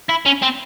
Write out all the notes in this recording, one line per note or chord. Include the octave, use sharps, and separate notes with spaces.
E4
C#4
C4